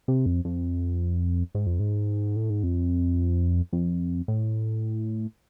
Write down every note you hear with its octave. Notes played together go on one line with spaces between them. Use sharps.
C3
F2
F2
G#2
F2
G#2
A2
G#2
F2
F2
A2